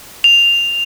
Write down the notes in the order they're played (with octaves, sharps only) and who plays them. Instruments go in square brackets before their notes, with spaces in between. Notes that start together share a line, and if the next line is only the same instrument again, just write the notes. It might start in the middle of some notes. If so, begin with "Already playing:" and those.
[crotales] F7